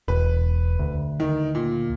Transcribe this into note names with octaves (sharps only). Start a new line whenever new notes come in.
E1 B4
D2
D#3
A#2